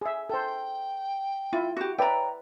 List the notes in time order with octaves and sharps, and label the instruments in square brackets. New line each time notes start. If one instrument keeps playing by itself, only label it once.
[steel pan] G#4 E5
[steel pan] A4 C5 [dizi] G5
[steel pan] E4 [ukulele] F4
[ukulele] F#4 G4
[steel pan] B4 D5 E5 [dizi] C#5 [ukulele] G5 A#5